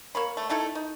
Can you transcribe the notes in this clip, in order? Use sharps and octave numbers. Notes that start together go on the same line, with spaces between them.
A#3 C#5 B5
A3
A3 D#4 E4 A4
D#4